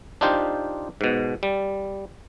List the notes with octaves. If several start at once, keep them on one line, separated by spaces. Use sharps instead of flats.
D4 D#4 F4 G4 C5
G#2 B2
G3